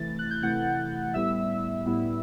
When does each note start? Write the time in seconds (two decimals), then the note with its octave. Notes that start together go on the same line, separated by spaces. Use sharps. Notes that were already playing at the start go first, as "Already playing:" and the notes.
Already playing: C3 E3 A3 E4 A6
0.19 F#6
0.31 G6
0.42 C3 E3 A3 E4 F#5 F#6
1.14 A2 G3 B3 E4 E5 E6
1.86 A2 G3 B3 E4